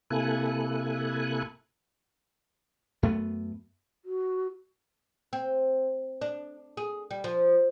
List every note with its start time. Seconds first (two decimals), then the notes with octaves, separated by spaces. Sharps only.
0.10 C3 A#3 E4 A4 G#5 F#6
3.03 F#2 A3 B3
4.05 F#4
5.33 C4
6.21 D4
6.77 G#4
7.11 G3
7.24 F3